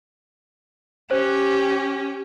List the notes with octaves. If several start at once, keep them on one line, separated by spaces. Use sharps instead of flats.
C#4 G4 C5